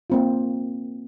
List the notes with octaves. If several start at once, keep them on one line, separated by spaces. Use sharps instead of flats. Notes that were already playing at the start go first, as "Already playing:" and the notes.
A#3 C4 F4